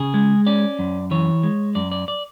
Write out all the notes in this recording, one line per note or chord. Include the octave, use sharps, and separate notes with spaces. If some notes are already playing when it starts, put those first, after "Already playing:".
Already playing: C#3 G#4
G#3
C#4 D5
F#2
E3 C#5
G#3
F#2 D5
D5
D5